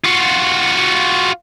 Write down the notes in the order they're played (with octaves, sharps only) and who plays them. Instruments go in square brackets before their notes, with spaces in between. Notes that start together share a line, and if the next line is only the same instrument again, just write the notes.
[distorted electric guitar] F4 F#4